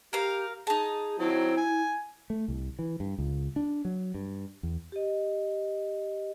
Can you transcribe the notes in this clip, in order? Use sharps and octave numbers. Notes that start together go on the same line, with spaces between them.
G4 A#4 F5
D#4 G#4 A5
F#3 C4 E4
G#5
A3
C2
E3
G2
C#2
D4
F#3
G2
E2
G4 D#5